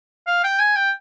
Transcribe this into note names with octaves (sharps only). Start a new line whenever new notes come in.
F5
G5
G#5
G5